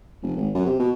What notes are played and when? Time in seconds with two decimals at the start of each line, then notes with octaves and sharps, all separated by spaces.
0.23 F1
0.37 G#1
0.55 F#2
0.66 C3
0.79 B2